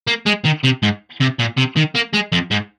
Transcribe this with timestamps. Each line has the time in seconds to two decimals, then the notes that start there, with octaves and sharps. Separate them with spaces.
0.08 A#3
0.26 G#3
0.45 D#3
0.64 C3
0.83 G#2
1.20 C3
1.39 A#2
1.57 C3
1.76 D#3
1.95 A#3
2.13 G#3
2.32 F2
2.51 G#2